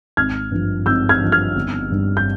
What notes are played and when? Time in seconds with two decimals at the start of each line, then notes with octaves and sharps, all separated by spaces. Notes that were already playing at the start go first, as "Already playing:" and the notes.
0.17 G#1 F6 G#6
0.52 G2 F3
0.86 G#1 E6 G6
1.09 F6 G#6
1.21 G2 F3
1.32 F6 G#6
1.56 G1
1.90 G2 G3
2.17 G6